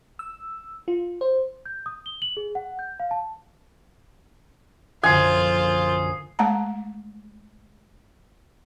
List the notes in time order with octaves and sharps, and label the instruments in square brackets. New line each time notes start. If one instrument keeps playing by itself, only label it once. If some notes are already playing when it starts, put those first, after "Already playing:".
[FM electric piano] E6
F4
C5
[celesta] G6
D#6
G7
F#7
G#4
F#5
G6
F5
A5
[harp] A#1 F#2 D3 [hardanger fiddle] F4 C5 [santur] G#5 [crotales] D#6 C7
[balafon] G#3 A3 F#5 A5 A#5